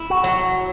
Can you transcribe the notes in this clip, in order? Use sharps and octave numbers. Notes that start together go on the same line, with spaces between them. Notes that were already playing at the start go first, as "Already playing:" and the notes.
Already playing: E4
F#4
F#3